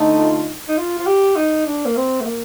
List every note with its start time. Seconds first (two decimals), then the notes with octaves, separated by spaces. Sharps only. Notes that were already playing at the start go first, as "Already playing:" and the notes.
Already playing: D3 A3 D#4
0.17 F4
0.68 D#4
0.77 F4
0.98 F4
1.07 G4
1.36 D#4
1.66 D4
1.85 A#3
1.97 C4
2.21 A3
2.26 A#3